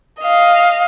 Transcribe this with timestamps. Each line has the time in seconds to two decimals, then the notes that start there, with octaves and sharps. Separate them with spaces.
0.21 D#5 F5